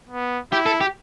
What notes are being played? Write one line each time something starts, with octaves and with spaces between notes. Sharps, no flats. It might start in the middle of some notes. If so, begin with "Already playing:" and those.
B3
E4 G4
A4
G4